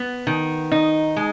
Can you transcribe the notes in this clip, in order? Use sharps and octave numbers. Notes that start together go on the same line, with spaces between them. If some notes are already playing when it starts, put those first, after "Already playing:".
Already playing: B3
D#3
D#4
G#3